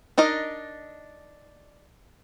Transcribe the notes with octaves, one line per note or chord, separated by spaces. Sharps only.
D4 D#4 A#4 D#5